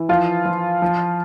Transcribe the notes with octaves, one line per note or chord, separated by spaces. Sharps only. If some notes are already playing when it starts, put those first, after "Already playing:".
Already playing: E3
F3 F4
F3
F3